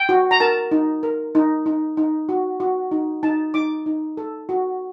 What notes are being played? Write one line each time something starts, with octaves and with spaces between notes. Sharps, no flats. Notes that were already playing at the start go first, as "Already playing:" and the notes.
Already playing: G5
F#4
A#5
A#4 A5
D#4
A#4
D#4
D#4
D#4
F#4
F#4
D#4
D#4 A5
D#4 D6
D#4
A4
F#4